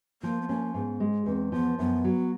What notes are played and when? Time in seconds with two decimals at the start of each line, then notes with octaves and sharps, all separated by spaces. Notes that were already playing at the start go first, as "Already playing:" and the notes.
0.23 F3 A#3
0.41 B3
0.49 A#3 C#4
0.74 G#2 B3
1.00 G#3
1.26 E2 C4
1.52 F3 B3
1.79 F#2 B3
2.04 F#3